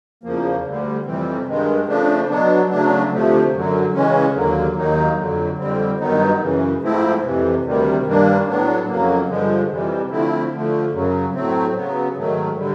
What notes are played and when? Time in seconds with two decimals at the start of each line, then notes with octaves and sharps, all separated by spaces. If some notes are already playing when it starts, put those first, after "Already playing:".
0.24 E2 C#3 F3 A#3
0.65 D2 D3 G3
1.05 F2 C3 E3 G3 C4
1.46 G2 D#3 G#3
1.87 C#3 F3 A3 D4
2.29 B2 F#3 B3 D4
2.70 C#3 F#3 A3 D4
3.12 D2 C3 F3 A3
3.52 F#2 D3 F#3
3.93 C#3 E3 G#3 C#4
4.34 D#2 D3 F#3 A#3
4.76 D#2 D#3 F#3 A#3 D#4
5.18 F2 D3 F#3
5.58 F2 D3 G3 C4
6.00 G2 D#3 F#3 B3 D#4
6.40 F#2 C#3 E3
6.82 G#2 F3 A3 C4 E4
7.23 F2 C3 E3
7.64 D2 C3 D#3 G3
8.04 G2 D#3 G3 A#3 D4
8.47 A2 F#3 B3 D4
8.88 F2 C#3 F#3 A#3
9.29 G2 D3 F3 G#3
9.69 F2 C3 E3 G3
10.10 D3 F3 A3 C4 E4
10.51 D3 F3 A3
10.93 F#2 C#3 F#3
11.34 A2 F#3 A3 C4
11.76 C#3 F#3 B3
12.16 G#2 D#3 F#3 A3
12.57 D3 G3